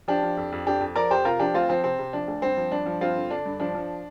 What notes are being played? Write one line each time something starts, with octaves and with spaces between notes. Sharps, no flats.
F3 D4 G4
F3
F2
F2
F2 D4 G4
F2
F3 A#4 D5
F2 G4 C5
C3 F4 A#4
F3 D4 G4
D2 C4 F4
F3 C4
C3 C4
C3
F3 D4
D2
G2 C4
F3
G2 D4
F3
G2 C4 F4
D3
D3 D4
G2
F3 D4
F3